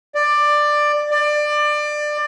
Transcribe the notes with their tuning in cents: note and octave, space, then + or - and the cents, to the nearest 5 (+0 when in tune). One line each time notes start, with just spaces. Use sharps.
D5 +15
D5 +25